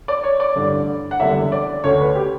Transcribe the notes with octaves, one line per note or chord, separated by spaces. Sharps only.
D5
C#5
D5
A1 G2 D3
F#5
F#1 E2 D3 G3 E5
D5
D2 D3 A3 C#4 C#5
B4
G4